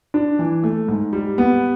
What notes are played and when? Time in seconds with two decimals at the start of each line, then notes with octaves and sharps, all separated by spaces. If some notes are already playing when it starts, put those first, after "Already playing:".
0.14 D4
0.39 E3
0.64 A3
0.88 G#2
1.13 G3
1.38 B3